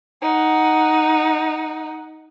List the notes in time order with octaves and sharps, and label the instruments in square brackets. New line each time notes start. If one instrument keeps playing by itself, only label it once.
[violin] D#4 F#5